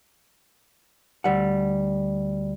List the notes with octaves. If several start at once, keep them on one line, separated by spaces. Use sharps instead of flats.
D2 G3 F#5